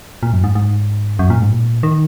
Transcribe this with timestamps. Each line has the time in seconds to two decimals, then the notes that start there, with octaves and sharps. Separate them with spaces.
0.23 A#2
0.33 F#2
0.44 G#2
0.55 G#2
1.19 F#2
1.30 A#2
1.41 G#2
1.51 A#2
1.83 D#3